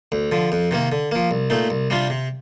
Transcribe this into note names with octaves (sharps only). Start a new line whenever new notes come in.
D2
D3 F3
F2
C3 D#3 A#3
D3
F3 A#3
C2
A#2 A3 D#4
C2
C3 G3 D4 F4
C3